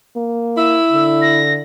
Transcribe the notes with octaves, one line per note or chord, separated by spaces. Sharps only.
A#3
E4 E6
D3
A#6